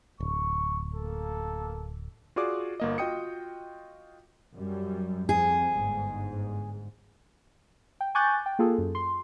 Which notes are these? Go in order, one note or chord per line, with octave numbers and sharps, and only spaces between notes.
D1 C#6
A#3 A4
F4 F#4 G#4 D5 D6
G1 A#3 D#5
F4 F#4 D#5 G5 D#6 C#7
F#2 G3
F2 G#4
G1 G#2
G5
G#5 C#6 D6 F#6 G6 A6
G5
A#3 F4 G#4 A4
F#2
C6